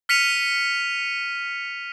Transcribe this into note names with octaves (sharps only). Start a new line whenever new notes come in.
F6 B6 C#7 D#7 F7